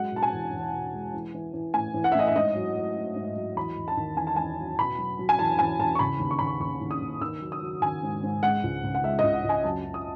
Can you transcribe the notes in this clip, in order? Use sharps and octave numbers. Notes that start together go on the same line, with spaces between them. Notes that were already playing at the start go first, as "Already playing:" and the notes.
Already playing: F#3 G#3 F#5
B2 A5
G#5
E2
E2
B2
G#3
E3
E3
E3
A2 G#5
E3
F#5
E5
A2 D#5
E5
G#2 D#5
F#3
F#3
F#3
G#2
F#3
E2 B5
E2
A5
D#3
E2 G#5
A5
E2 G#5
F#3
B2 B5
F#3
F#3
G#5
E2 A5
E2 G#5
E2 A5
C#6
C#3 B5
D#2
C#6
D#2 B5
C#6
D#2 C#6
D#2
D#6
D#2
D#3 E6
F#3
D#6
F#3
D#3 G#5
G#2
G#2
G#3 F#5
C#2
C#3
F#5
G#3 E5
C#2 D#5
F#5
C#2
G#5
F#2 A5
F#2
D#6